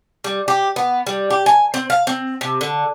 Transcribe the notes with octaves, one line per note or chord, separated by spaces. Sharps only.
G3
G4
B3
G3
G4
G#5
C4
F5
C4
C3
D3